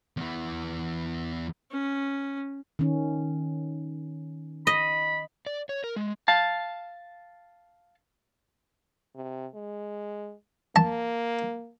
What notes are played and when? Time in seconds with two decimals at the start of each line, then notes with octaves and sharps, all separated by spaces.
0.17 E2 E3
1.71 C#4
2.79 D#3 C#4
4.67 D#5 B5
5.46 D5
5.69 C#5
5.84 A#4
5.96 G#3
6.28 F5 A5
9.15 C3
9.54 G#3
10.76 A#3 A5